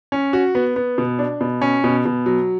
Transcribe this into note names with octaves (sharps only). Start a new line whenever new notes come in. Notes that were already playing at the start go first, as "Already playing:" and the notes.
C#4
F#4
B3
B3
B2
D4
B2
C#4
B2
B2
F#3